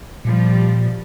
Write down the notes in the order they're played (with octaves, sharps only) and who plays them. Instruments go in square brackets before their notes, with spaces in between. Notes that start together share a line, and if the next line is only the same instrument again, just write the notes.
[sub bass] A#2 [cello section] F3 G3